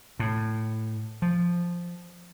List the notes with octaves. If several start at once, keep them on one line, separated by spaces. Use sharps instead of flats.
A2
F3